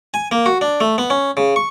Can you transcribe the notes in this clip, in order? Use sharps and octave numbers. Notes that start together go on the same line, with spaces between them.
G#5
A#3
F#4
D4
A3
B3
C#4
C#3
C#6